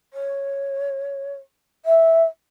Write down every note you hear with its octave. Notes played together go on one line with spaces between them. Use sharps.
C#5
E5